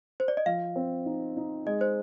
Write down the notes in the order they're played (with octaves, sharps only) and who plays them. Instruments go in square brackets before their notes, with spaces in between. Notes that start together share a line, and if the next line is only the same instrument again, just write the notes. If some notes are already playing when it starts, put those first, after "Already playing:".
[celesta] C5
D5
D#5
[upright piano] F3 [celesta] F5
[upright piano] C4
D#4
D#4
[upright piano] G#3 [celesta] D#5
[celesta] C5